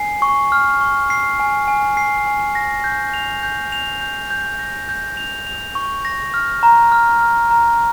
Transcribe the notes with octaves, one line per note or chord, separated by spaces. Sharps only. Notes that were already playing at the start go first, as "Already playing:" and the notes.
Already playing: G#5 C7
C#6
F6
C#6
C7
G#5
G#5
C7
G#5
A#6
G6
F7
G6
F7
G6
G6
A#6
G6
F7
F7
C#6
A#6
F6
A#5
F6
F6
A#5